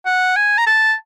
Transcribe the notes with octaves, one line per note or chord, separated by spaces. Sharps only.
F#5
G#5
A#5
A5